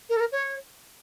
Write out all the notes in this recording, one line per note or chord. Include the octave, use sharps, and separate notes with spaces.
A#4
A4
A#4
C#5